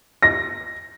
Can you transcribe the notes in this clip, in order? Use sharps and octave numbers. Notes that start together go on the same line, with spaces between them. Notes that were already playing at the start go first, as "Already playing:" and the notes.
A#6